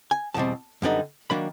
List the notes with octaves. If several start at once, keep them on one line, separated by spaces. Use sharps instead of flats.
G#5
E2 B2 G3 C4 A5
F#2 D3 G3 B3 D#4
D#3 F#3 A#3 D4 B5